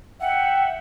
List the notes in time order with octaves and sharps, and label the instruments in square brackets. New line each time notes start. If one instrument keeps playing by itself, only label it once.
[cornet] E5 [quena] F#5 [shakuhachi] G5